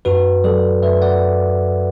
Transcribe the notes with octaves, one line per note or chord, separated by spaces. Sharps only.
F#2 F#4 B4
F#3 A4 D5
F#2 B4 E5
D5 F#5